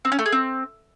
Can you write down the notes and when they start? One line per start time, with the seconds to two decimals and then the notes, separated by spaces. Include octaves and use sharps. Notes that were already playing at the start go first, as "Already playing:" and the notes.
0.05 C4
0.12 C#4
0.19 A3
0.26 G#4
0.33 C4